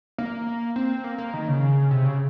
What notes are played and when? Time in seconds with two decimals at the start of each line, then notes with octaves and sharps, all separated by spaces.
0.18 A#3
0.76 C4
1.04 A#3
1.18 A#3
1.34 D#3
1.48 C#3
1.91 C3
2.05 C#3